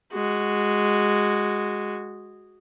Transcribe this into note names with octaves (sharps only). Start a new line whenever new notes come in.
G#3 F#4